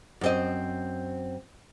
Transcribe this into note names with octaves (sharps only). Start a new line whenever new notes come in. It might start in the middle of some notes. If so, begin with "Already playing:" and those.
F#2 C4 D#5